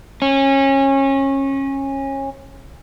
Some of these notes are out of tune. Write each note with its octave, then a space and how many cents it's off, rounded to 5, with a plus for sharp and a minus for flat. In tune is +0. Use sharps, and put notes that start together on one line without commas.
C#4 -25